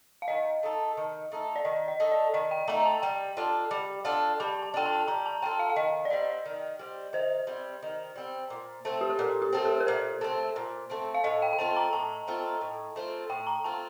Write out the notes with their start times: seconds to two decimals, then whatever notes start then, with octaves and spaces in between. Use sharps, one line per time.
0.22 F5
0.28 D#3 D#5
0.63 A3 D#4 A4
0.97 D#3
1.32 A3 D#4 A4
1.56 D5
1.65 D#3 D#5
1.88 D#5
2.00 A3 D#4 A4
2.12 D5
2.34 D#3 D#5
2.51 G5
2.68 A3 D#4 A4 A#5
2.86 A5
3.02 G3 G5
3.37 D4 F4 A4
3.71 G3
4.05 D4 F4 A4
4.40 G3 A5
4.62 A5
4.74 D4 F4 A4 G5
4.86 A5
5.07 G3 A#5
5.26 A5
5.42 D4 F4 A4 G5
5.59 F5
5.70 F5
5.76 D#3 D#5
6.05 D5
6.10 G3 C4 D#5
6.46 D#3
6.79 G3 C4
7.13 D#3 C5
7.47 G3 C4
7.83 D#3
8.16 G3 C4
8.50 A#2
8.85 A3 C4
9.01 G4
9.10 A4
9.19 A#2 A#4
9.42 G4
9.53 A3 C4 G4
9.65 A4
9.80 A#4
9.87 A#2 C5
10.21 A3 C4
10.56 A#2
10.90 A3 C4
11.14 F5
11.24 A2 D#5
11.42 G5
11.53 G5
11.58 A3 C4 F4 A5
11.76 A#5
11.93 A2 A5
12.28 A3 C4 F4
12.61 A2
12.96 A3 C4 F4
13.30 A2 G5
13.47 A#5
13.64 A3 C4 F4 A5